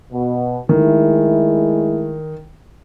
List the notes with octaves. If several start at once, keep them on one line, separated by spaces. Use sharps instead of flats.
B2
D#3 G#3 A3 E4